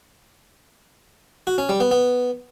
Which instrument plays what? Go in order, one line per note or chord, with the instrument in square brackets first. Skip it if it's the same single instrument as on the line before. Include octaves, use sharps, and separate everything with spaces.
[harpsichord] F#4
C#4
G3
B3
B3